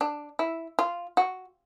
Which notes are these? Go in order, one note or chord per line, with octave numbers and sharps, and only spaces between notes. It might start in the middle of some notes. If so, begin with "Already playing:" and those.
D4
E4
F4
F#4